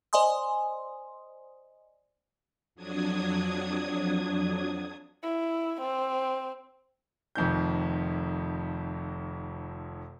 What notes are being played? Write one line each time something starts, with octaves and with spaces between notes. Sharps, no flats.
C5 D5 D#5 G#5 C6 D#6
F2 F#3 D4 D#6 G#6
E4
C4
F1 F2 D#3 G6